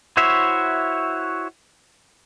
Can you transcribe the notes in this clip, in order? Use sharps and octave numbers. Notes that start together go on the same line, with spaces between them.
E4 F#4 C5 C#5 E5